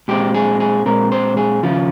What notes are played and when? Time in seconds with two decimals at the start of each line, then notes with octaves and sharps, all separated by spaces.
0.08 A#2 G#3 C4 G4
0.34 G#4
0.60 G#4
0.86 A#2 G#3 C4 A#4
1.12 C5
1.37 G#4
1.63 D#2 C#3 F3 F4